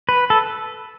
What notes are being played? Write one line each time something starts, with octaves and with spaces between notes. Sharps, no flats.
B4
A4